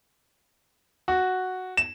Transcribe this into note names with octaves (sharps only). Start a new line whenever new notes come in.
F#4
E7